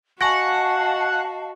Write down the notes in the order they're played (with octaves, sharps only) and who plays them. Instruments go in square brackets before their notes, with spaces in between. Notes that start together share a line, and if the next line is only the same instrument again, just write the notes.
[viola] F#4 [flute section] D#5 F5 A5 [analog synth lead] F#5 [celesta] G#5 C#6 A#6